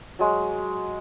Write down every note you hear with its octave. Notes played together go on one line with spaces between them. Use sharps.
F#3 G#3